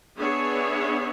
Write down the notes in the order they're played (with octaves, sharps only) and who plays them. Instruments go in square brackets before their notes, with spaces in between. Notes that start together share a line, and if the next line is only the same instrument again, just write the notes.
[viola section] B3 D4 G#4 C#5 E5